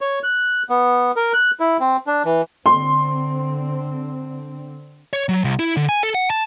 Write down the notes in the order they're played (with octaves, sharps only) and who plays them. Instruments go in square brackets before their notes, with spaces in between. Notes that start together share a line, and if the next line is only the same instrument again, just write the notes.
[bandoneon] C#5
F#6
B3
A#4
F#6
E4
C4
D4
E3
[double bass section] D3 C4 [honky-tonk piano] C6
[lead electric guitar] C#5
F#3
C2
E4
D3
G#5
A4
F#5
A5